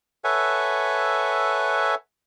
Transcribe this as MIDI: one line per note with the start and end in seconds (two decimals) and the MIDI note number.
0.24 1.95 69
0.24 1.95 71
0.24 1.95 73
0.24 1.95 76
0.24 1.95 78
0.24 1.95 80